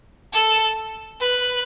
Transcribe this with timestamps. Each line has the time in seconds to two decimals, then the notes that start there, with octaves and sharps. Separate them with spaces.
0.33 A4
1.21 B4